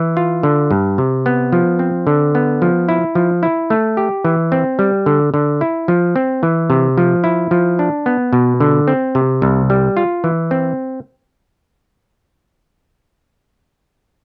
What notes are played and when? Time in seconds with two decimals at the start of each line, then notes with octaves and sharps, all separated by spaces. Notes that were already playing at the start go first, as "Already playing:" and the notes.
Already playing: E3
0.17 F4
0.43 D3
0.71 G2
0.98 C3
1.26 B3
1.53 F3
1.79 C4
2.07 D3
2.35 B3
2.62 F3
2.89 E4
3.15 F3
3.43 E4
3.70 A3
3.97 G4
4.25 E3
4.52 C4
4.79 G3
5.06 D3
5.34 D3
5.61 E4
5.88 F3
6.16 C4
6.43 E3
6.70 C3
6.98 F3
7.24 E4
7.51 F3
7.79 D4
8.06 B3
8.33 B2
8.60 D3
8.88 C4
9.15 C3
9.42 C2
9.70 G3
9.97 F4
10.24 E3
10.51 C4